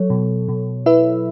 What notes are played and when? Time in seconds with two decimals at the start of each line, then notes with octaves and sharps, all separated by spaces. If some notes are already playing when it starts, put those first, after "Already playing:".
Already playing: F#3 A4 C#5
0.10 B2
0.48 B2
0.86 E4 B4 E5